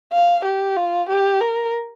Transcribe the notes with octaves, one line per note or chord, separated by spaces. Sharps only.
F5
G4
F4
G4
A#4